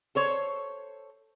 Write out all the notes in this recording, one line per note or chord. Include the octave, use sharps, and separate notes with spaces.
A4 C5 C#5